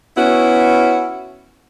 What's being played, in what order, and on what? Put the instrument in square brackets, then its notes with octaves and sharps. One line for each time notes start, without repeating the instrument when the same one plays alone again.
[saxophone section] B3 C#4 E4 F#4